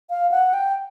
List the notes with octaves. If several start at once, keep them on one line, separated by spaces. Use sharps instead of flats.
F5
F#5
G5